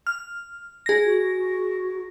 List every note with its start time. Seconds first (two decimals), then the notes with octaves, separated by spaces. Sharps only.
0.07 F6
0.86 G#4 A#6
1.05 F#4